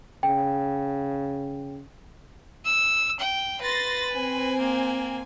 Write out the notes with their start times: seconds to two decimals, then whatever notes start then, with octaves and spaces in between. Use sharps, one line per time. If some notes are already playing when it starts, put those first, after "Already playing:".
0.23 C#3 G5
2.65 E6
3.19 G5
3.61 B4 C6 A6 A#6
4.12 C4 G#5
4.59 A#3